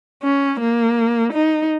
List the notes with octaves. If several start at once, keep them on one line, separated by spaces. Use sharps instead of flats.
C#4
A#3
D#4